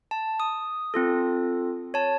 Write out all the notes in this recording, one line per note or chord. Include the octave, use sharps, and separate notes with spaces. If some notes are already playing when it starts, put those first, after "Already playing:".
A5
D#6
C4 F4 A4
C#5 A5